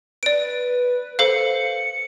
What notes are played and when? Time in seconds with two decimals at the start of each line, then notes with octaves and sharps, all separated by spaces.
0.23 B4 D5 D7
1.19 A4 C5 F5 C#7